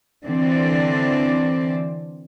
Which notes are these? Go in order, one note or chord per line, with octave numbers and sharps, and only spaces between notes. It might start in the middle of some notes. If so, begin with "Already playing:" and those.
D3 E3 C4 D5